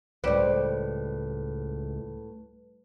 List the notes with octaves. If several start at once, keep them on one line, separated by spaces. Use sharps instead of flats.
C#2 A2 G3 G4 B4 C5